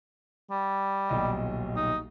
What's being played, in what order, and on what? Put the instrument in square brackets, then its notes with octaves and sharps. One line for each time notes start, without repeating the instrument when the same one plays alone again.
[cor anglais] G3
[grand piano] D#1 B1 D#5
[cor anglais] D#4